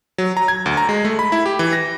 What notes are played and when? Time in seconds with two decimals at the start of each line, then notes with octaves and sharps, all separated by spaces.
0.18 F#3
0.37 A#5
0.48 G#6
0.66 D2
0.77 A#5
0.89 G#3
1.05 A3
1.19 B5
1.32 E4
1.46 G4
1.59 E3
1.73 A#6